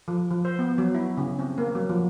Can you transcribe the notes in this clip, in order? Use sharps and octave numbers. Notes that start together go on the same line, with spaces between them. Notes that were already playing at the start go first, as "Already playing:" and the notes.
F3
F3
C5
B3
F#3
E4
C#3
C4
A#3
F#3
F3